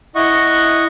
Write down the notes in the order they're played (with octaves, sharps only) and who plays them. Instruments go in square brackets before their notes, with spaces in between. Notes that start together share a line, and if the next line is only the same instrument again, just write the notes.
[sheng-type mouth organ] E4 D#5 F#5 C#6